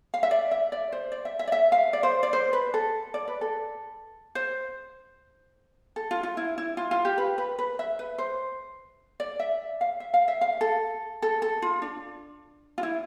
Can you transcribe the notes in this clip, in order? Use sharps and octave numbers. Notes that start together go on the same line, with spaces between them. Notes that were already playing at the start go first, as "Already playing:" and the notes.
F5
E5
D5
E5
D5
C5
D5
E5
E5
D5
E5
F5
D5
C5
D5
C5
B4
A4
D5
B4
A4
C5
A4
F4
F4
E4
E4
F4
F4
G4
B4
B4
B4
E5
B4
C5
D5
E5
F5
E5
F5
E5
F5
A4
A4
A4
F4
D4
F4
E4